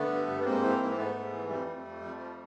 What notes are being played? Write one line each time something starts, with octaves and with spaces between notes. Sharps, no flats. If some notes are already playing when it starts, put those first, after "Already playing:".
Already playing: D3 A3 B3
G2
G2
B3
G#2 A#3 C4
E3
G#2
C4
G#2 A3 B3
G#2
E3
F2 G3 A3
F2
F2
F2
F3